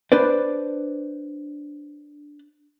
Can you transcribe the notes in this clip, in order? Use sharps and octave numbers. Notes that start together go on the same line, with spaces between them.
D4 B4 C5 D5